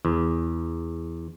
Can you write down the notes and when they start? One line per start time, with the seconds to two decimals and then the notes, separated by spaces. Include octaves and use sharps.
0.05 E2